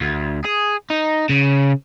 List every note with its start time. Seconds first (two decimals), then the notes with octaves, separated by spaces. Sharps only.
0.01 D2
0.45 G#4
0.90 D#4
1.29 C#3